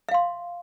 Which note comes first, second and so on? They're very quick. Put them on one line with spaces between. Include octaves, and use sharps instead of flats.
E5 F5 C6